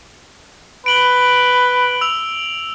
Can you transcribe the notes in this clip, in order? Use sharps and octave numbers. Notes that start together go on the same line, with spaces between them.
B4 D7 F#7 G7
E6 F7